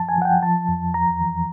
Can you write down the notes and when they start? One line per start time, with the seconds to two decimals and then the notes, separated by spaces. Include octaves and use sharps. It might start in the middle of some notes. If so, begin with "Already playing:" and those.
Already playing: F#2 F3 A5
0.09 G#5
0.17 F3 F#5
0.25 G5
0.42 F3 A5
0.68 F2
0.94 E2 A#5
1.21 E3